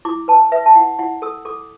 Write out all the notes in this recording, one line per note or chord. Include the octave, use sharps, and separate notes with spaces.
E4 D6
B4 A5
B4 E5
A5
E4 F#5
E4 F#5
A4 E6
A4 D6